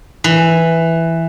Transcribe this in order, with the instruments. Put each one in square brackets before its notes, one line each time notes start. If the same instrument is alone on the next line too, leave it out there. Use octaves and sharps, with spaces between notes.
[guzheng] E3